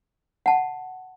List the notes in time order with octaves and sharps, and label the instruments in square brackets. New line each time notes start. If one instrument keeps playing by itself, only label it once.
[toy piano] F#5 A5